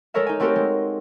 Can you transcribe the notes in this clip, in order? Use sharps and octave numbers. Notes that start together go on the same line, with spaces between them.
G#3 A3 A4 A#4 C#5 E5
D#4 G#5
A3 C4 F#4 G4 A4 A#4
G#3